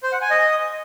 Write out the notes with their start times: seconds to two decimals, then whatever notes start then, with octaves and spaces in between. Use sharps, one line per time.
0.03 C5
0.12 F#5
0.22 G#5
0.31 D#5